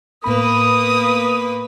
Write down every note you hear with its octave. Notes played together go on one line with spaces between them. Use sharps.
A2 A#3 B3 B4 B5 D#6